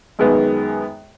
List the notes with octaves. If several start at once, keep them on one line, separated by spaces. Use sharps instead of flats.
F#2 D#3 G#3 B3